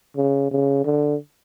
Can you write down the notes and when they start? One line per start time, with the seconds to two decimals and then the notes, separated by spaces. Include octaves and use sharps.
0.17 C#3
0.51 C#3
0.85 D3